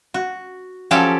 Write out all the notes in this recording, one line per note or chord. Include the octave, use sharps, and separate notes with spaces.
F#4
F3 F#3 C#4 G4 A4 D5